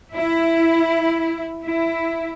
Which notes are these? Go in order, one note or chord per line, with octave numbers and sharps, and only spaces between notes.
E4
E4